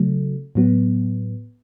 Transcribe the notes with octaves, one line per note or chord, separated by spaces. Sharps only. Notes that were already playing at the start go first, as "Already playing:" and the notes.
Already playing: C#3 F#3 A3
A2 F#3 B3